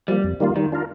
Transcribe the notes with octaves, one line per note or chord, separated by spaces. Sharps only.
F3 G3 A#3
F2
D#3 G3 A#3 F4
D#3 G3
D4 F4 A#4